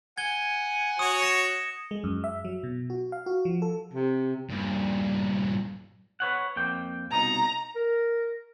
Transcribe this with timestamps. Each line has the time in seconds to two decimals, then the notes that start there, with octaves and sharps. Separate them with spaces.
0.18 F#5 G#5 G#6 G7
0.99 F#4 C#5 D#6
1.22 A#6 C#7 E7
1.91 G#3
2.04 F#2
2.24 E5
2.45 F#3
2.63 B2
2.90 F#4
3.12 F5
3.26 F#4
3.45 F3
3.62 A4
3.93 C3
4.50 G2 A#2
6.20 B4 C#5 F#5
6.56 F2 A#3 G5
7.11 C2 B2 D#4 A#5
7.76 A#4